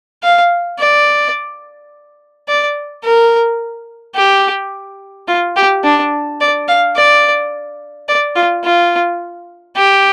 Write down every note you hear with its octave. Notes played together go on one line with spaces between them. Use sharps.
F5
D5
D5
A#4
G4
F4
G4
D4
D5
F5
D5
D5
F4
F4
G4